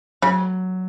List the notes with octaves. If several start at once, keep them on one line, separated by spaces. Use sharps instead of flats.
C#3 F#3